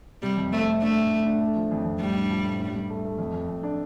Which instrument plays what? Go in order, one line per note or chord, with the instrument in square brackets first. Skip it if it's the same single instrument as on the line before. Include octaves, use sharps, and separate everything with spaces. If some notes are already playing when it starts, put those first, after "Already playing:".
[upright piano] C3 [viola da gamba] G3
[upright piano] F2
[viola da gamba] A3 [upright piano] C4
[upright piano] C4
[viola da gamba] A3 [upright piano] D4
[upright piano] A2
A2
D4
A3
F3
F2
F2
[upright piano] A2 [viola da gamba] G3
[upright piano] D4
F3
A2
G2
G2
A3
A3
F2
F2
F2
D4